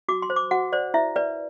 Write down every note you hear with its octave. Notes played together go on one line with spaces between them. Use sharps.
F#4 D6
C6
C5
D6
F#4 F#5
C5 D5
E4 E5
B4 D5